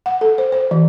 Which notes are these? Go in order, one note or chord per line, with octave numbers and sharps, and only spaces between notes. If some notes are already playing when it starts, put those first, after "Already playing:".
F#5
A4
C5
C5
E3